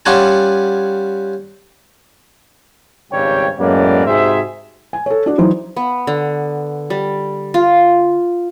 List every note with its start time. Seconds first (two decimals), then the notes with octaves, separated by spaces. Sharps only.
0.06 G3 C#4 F4 F#5 G#5 A5
3.12 G#1 C#2 G2 G3 C#5 G5
3.59 F#2 A2 G#3 A#3 B3 D5
4.06 G#2 C3 F#4 G#4 C5 E5
4.93 G#5
5.06 A4 C#5
5.26 D4 F#4 D5
5.38 E3 F#3 D#4 C5
5.76 B3
6.07 D3
6.90 G3
7.54 F4